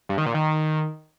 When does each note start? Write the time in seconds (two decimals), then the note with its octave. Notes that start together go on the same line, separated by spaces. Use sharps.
0.09 G2
0.18 D#3
0.26 A#2
0.34 D#3